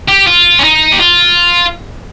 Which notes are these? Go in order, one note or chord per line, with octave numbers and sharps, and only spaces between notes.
G4
F4
C#4
D#4
G4
F4